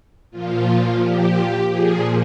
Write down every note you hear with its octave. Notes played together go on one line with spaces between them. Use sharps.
A#2 F3 F4
G4
A#2 F3 G#4